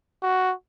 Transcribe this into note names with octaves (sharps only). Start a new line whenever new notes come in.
F#4